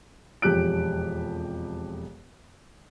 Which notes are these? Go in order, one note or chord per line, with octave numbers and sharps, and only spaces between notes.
E1 F2 G4 F#6 D7